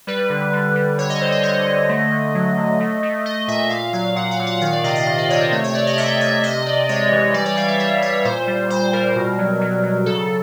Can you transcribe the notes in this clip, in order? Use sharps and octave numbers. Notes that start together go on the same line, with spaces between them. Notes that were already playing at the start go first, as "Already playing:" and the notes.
G3 B4
D3
G3
G3
D3 C#5
D#5
D3 C5
C#5
D3 D#5
D3
A3
D3
F#3
D3
A3
A3
A3 D#5
A#2 E5
A#2 F5
F#3 F5
A#2 F#5
F5
A#2
F#5
D#3 F5
D5
C3 D#5
D#5
D#3 D#5
D5
C3 C#5
C5
A3 C#5
C#5
A3 D5
D#5
C3 E5
C3 E5
C3 D#5
C3 D5
G#3 C#5
E3
G3 D5
C#5
G3 F5
E5
G3 C#5
G3 C#5
A#2 C5
G3
A#2 C5
G3 A#4
B2
F#3
F#3
F#3
C#3 A4